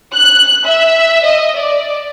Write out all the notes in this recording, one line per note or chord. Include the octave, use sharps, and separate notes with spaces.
F#6
E5
D#5
D5